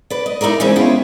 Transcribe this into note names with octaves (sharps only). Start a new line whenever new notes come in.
B4 D5
D#5
D#4 E4 A4 A#4 D5
C#3 E3 G#3 C4 C#4 D#4
B3 C#4 E4 F4 G4 G#4